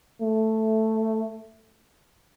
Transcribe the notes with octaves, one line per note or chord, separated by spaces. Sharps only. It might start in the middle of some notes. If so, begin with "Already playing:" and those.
A3